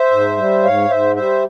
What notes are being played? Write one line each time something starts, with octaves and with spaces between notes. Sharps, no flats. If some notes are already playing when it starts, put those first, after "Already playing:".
Already playing: C5 E5
G#2
G3
G#2 C#5 F5
G#2 C5 E5
G3 C5 E5